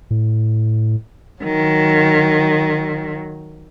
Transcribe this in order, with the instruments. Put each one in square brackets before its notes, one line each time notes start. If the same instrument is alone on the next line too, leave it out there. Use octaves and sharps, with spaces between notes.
[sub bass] A2
[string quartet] D#3 F#3